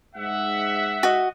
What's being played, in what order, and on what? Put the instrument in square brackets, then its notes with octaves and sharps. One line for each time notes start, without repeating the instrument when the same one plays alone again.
[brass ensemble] G#2 E5 F#5
[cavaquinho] F#4 D#5